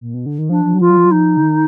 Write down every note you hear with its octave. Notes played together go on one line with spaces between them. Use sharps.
A#2
B2
D3
D#3
F3 D4
F3
F#3
F3 F4
F#3
F3
F#3
F3 D#4
D3
D#3